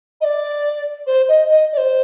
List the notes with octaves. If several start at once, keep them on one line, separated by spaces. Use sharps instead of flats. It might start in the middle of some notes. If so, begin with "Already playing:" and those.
D#5
D5
C5
D#5
D#5
D5
C5